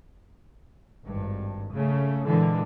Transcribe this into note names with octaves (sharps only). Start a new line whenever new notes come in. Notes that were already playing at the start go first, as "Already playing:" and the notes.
G#1 G2
C#3 A3
A#2 D3 E3 G#3